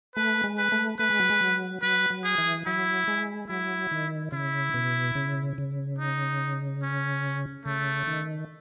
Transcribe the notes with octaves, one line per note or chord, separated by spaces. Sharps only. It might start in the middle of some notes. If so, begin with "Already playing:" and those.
A3 B4
G#3
B4
A3
A3 B4
G#3
F#3
G#3
F#3
F#3 B4
F#3
G#4
E3
F#3 E4
G#3
F#3 E4
D#3
C#3 E4
B2
C#3
C#3
D#4
C#4
C#3 A3
D#3